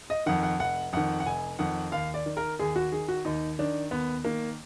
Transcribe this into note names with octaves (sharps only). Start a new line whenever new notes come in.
D#5
F2 D#3 F#5
F#5
F1 F#5
F2 D#3 F#5
F#5
F1 G#5
F2 D#3 F#5
D#2 F5
D5
D#3
A#4
D#2 G#4
F#4
D#3 G#4
F#4
D#2 D#4
D#3 D4
D#2 B3
D#3 A#3